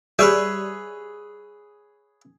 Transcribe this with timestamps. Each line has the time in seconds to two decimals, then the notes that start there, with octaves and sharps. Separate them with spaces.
0.19 G3 G#4 B4 C#5 E5